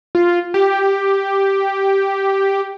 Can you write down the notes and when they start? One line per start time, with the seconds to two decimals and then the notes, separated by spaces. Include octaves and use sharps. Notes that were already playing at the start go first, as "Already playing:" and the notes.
0.15 F4
0.54 G4